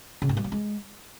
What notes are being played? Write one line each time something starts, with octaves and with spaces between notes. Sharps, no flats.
C#3
G#2
G3
F#3
G#3